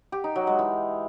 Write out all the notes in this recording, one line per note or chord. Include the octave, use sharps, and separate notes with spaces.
G4
D#4
F#3
G#3
E3